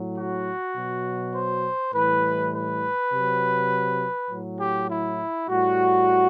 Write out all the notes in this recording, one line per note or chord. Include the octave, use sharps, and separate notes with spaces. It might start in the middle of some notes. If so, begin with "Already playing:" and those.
Already playing: A2 F#3
F#4
B2 F#3
C5
A2 E3 G3 B4
B4
C3 F#3
A2 F#3
G4
E4
A2 G3 F#4